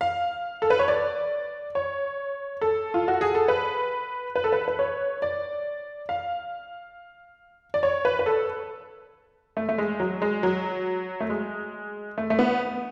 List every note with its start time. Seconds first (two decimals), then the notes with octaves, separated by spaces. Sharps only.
0.01 F5
0.62 A4
0.70 B4
0.79 C#5
0.88 D5
1.75 C#5
2.61 A4
2.94 F4
3.08 F#4
3.21 G#4
3.35 A4
3.48 B4
4.36 B4
4.44 A4
4.52 B4
4.68 B4
4.79 C#5
5.22 D5
6.09 F5
7.74 D5
7.83 C#5
8.05 B4
8.19 B4
8.26 A4
9.57 A3
9.69 A3
9.78 G#3
10.00 F#3
10.22 G#3
10.43 F#3
11.20 A3
11.30 G#3
12.18 A3
12.30 A3
12.39 B3